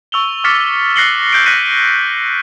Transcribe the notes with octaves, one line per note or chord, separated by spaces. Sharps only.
C#6 E6 F7 G7
C#6 D6 F6 A6 B6 C#7
F#6 A#6 C7 C#7 F#7 G7
F#6 G6 D7
F#6 A#6 B6 C#7 D#7